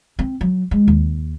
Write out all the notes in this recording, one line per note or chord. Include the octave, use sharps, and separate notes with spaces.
C4
F#3
G#3
D#2